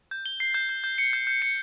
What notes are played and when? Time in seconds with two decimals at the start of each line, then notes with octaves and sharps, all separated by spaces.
0.11 G6
0.26 G7
0.40 C7
0.54 G6
0.69 G6
0.84 G6
0.98 C#7
1.13 G6
1.27 G6
1.42 C#7